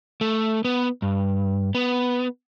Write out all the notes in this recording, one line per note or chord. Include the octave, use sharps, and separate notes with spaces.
A3
B3
G2
B3